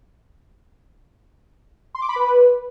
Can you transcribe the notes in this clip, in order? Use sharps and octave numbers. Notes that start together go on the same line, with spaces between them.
C6
D6
B5
B4